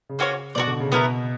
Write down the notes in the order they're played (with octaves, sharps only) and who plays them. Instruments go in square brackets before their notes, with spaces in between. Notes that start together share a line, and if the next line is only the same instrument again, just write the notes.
[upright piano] C#3
[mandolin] A#3 C#4 F#4 C#5
[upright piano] B2 [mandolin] F#4 A#4 D5
[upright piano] D3
C#3
[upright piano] B2 [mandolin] B3 E4 A#4